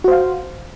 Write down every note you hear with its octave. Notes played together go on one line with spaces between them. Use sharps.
F#4 C5 F5